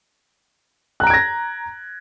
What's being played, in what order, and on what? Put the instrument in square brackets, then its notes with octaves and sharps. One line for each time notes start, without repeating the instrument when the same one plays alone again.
[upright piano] F#6
A#5
D7
G#6
A#6